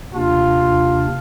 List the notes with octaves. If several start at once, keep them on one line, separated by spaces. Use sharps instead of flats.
D#2 C3 D4 F4